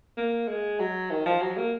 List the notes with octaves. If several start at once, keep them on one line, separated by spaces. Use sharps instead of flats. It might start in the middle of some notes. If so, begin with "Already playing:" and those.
A#3
G#3
F#3
D#3
F3
F#3
A#3